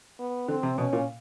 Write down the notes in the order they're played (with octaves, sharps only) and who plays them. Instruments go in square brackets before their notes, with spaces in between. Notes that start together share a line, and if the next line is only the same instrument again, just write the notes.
[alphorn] B3
[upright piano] D3 [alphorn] C4
[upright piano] C3
[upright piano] B2 [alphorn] C#4
[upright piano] A#2